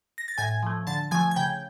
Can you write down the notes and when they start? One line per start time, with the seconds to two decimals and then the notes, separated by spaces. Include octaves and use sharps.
0.18 A#6
0.28 A6
0.38 A2 G#5 G#6
0.63 F3 A3
0.87 D3 A5 A6
1.11 F3 A3 G#5 G#6
1.31 G#6
1.36 C#3 G5 G6